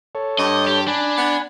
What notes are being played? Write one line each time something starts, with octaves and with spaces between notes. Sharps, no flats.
A4 C#5
G2 D#5
G4
D4 G#5 B5
B3